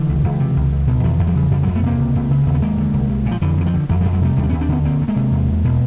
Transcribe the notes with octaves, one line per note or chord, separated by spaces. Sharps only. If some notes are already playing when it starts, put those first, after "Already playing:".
Already playing: D3 E3
C#2
C#2
C3
C#2
C#2
B2
E2 D#3 F3
E2
F3 G3
C#3
F2 F3 G3
F2 F#3 G#3
A3 B3
C3 A#3 C4
C#2
C#2
C#3
D#2 A#3
B3
D#2 G#3 A#3
D3
C2
C2
A#2
F3
F2 D3 E3
F2 E3
D#3 F3
D3
F2 E3 F#3
F2 F3 G3
F#3 G#3
C3 G3 A3
D#2 G3 A3
D4
D#2 B3 C#4
C4 D4
D3 B3 C#4
D2 A#3 C4
D2
G#3 A#3
C3
E2
E2
B2